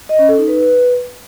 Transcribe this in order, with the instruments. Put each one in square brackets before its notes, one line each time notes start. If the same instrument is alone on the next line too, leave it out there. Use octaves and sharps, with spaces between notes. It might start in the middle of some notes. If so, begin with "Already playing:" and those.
[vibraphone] D#5
C#4
A4
D#4
B4